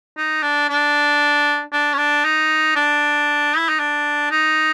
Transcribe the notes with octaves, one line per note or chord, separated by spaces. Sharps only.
D#4
D4
D4
D4
C#4
D4
D#4
D4
E4
D#4
D4
D#4